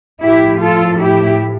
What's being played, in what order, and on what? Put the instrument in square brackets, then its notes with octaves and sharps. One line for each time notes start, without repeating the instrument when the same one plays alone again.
[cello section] A2 F3 E4 G4
F4 A4
E4 G4